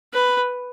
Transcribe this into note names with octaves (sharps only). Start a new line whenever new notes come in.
B4